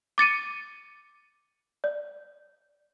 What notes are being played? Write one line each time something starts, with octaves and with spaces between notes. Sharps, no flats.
D6 A6 C#7 D#7
D5